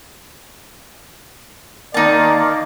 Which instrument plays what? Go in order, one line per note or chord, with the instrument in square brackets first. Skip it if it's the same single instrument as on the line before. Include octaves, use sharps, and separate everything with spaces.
[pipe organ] D#3 A#3 [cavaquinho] D#4 A5 [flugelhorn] D5